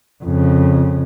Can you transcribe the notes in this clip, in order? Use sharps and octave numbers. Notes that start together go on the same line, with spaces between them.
F2 C#3